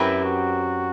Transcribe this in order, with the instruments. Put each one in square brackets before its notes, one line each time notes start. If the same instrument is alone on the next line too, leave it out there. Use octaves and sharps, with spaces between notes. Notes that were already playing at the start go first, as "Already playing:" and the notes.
Already playing: [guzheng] F#2 F#3 C4 G4 B4 [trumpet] E4
[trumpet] F#4